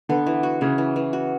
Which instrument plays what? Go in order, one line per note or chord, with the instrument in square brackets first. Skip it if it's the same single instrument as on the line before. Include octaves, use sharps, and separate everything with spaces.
[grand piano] D3 [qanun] B3
[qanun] E3
F#4
[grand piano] C#3 [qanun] E3
[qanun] E3
E3
F#4